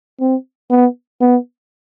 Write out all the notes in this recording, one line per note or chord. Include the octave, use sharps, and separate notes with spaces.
C4
B3
B3